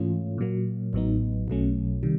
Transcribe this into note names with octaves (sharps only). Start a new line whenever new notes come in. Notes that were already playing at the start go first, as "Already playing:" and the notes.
Already playing: G#2 E3 A3 C#4 F4
A#2 F#3 A#3
A1 A2 F#3 B3 D#4
B1 B2 F#3 A3 C#4
C3 D#3 G3